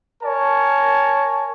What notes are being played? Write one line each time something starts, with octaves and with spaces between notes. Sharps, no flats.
A#4 C#5 G#5 A5